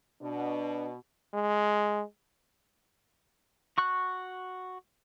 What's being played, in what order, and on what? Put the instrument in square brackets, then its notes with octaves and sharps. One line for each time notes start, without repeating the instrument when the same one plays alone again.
[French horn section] B2 [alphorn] D4
[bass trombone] G#3
[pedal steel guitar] F#4 C#6 F#6